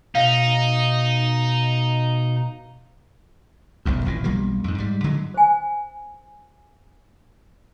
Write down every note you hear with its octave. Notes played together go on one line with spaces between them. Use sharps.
B2 D#4 F5
F1 B1 F#2
D#1 A1 A#2
B1 F3 G3 A#3
F2 G#2
G#2 G3
D3 F#3 G#3
C5 G#5